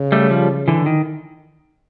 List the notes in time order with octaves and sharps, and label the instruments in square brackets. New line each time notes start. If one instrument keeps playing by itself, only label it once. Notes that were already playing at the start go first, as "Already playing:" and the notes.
Already playing: [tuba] C#3
[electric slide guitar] G3 A3
F3 G3
D3 E3
D#3